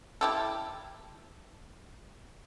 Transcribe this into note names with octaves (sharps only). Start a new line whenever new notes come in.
E4 G4 A4